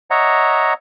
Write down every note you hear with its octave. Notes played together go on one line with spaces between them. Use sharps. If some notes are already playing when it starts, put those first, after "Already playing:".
C#5 D#5 E5 F#5 A#5